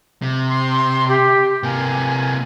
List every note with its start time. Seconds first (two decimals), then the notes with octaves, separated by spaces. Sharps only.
0.22 C3
0.49 C6
1.08 G4
1.63 C3 A#3 G#5